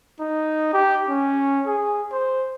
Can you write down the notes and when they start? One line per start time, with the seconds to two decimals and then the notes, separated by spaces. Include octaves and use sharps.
0.20 D#4
0.74 G4
1.09 C#4
1.66 G#4
2.13 C5